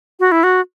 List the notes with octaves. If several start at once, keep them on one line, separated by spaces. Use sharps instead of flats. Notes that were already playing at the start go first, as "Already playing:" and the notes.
F#4
E4
F#4